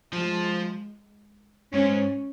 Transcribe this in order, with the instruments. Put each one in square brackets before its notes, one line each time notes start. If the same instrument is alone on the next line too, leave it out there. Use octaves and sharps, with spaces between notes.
[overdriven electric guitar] F3 [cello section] G#3
[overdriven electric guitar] G#2 [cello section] C#4